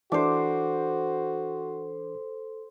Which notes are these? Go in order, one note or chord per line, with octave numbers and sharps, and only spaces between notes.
E3 D4 F#4 A4 C5 D6